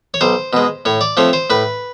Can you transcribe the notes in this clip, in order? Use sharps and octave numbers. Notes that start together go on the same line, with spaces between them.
C#5
B1 C5
B2 G#3
A2 C#5
D5
F3 A3 C4 C#5
C5
A2 B4